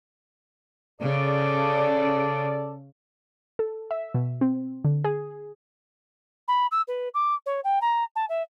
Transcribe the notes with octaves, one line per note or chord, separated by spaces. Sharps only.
C#3 A4 D5
A4
E5
B2
C4
D3
G#4
B5
E6
B4
D6
C#5
G5
A#5
A5
E5